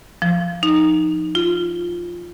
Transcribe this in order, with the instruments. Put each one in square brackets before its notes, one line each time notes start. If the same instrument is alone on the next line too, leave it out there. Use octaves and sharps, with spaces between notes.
[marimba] F3
D#4
F4